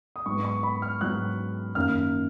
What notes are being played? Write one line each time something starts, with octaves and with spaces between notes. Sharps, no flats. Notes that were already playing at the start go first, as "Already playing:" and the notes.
D#6
G#2 F#3 B3 C#6
C#6
B5
F6
G#2 F#3 B3 F#6
F#2 D#3 A#3 F6